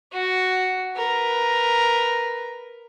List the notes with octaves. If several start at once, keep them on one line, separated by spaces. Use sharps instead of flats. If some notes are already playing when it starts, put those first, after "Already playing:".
F#4
A#4 B4